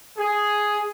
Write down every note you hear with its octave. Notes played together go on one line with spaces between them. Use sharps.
G#4